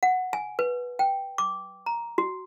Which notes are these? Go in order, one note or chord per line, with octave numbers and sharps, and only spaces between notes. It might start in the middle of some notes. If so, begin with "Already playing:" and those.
F#5
G#5
B4
G5
D6
A#5
F#4